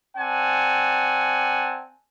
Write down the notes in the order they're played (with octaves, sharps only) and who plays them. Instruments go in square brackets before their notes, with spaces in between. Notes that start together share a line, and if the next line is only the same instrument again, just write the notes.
[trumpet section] C4 D5 F#5 G#5 A5